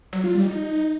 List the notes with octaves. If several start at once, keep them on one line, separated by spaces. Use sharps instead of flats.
F#3
F4
G3
D#4